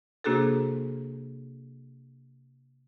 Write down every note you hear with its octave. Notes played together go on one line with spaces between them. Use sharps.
C3 A#3 D4 F#4 G#4 A4